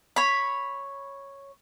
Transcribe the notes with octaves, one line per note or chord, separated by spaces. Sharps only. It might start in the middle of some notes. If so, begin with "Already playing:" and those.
C#5 B5